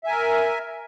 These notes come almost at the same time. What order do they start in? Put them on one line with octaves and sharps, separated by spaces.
E5 G#5 A#4